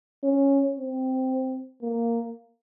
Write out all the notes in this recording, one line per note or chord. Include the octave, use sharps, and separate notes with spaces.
C#4
C4
A#3